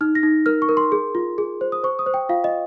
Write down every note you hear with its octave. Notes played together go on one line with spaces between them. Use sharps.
D#4 F6
A#6
D#4
A#4 F6
C#6
A#4
C6
G#4
F4
G#4
C5
D#6
C5 C#6
D#6
C5
G5
F4 F5
D#5